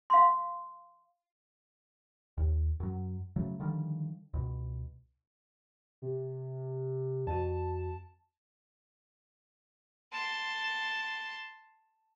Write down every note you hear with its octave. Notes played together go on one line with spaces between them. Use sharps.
F5 C6
D#2
F#2 F#3
C#3 F#3 A3
D3 D#3 F3 G3
C#2 B2
C3
F2 F#4 A5
A5 C6